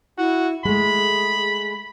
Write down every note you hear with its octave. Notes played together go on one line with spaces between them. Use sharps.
E4 F#4
G#3 A3 G#4 B5